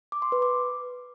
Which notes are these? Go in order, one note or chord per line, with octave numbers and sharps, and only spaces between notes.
D6
C6
B4
D6